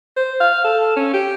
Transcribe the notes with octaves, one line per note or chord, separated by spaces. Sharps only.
C5
F5
A4
C#4
G4